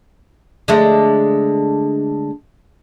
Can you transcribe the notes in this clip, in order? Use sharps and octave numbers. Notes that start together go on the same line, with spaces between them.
D3 G#3 A3